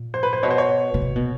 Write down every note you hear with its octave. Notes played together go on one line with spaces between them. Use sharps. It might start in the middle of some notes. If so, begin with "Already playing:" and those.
Already playing: A#2
C5
B4
C5
B2 C#5
C5
C#5
B2
C3
B2